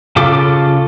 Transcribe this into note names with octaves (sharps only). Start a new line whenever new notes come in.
C#3 F4 A4 D6